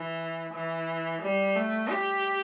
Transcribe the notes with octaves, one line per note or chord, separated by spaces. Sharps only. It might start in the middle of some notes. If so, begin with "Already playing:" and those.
Already playing: E3
E3
G3
A3
G4